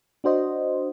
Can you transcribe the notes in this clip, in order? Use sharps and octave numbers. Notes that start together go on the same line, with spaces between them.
D4 F#4 C5 D#5